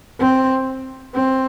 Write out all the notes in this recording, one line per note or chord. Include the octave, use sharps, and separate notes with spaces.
C4
C4